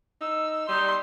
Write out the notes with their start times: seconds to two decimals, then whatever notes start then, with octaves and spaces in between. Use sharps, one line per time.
0.21 D#4 E6
0.69 G3 D#4 C6